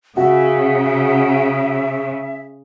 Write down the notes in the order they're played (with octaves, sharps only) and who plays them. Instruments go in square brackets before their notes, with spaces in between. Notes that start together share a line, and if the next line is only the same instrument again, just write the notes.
[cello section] C#3 [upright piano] F#4 [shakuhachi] E5